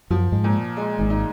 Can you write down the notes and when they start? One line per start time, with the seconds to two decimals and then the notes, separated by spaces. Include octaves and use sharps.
0.10 F#2 F3 F#3
0.32 G#2 G#3
0.44 A#2
0.77 G#3
0.99 G#1 G#2
1.10 D#4